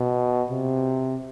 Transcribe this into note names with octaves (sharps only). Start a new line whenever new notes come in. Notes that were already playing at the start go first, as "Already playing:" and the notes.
Already playing: B2
C3